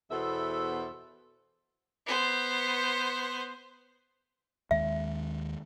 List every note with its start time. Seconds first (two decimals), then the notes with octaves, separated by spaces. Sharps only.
0.11 E2 B2 A4 C5 E5
2.07 B3 C5
4.71 D#2 D#3 G#3 E5